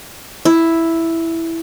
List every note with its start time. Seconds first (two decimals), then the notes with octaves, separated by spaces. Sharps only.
0.45 E4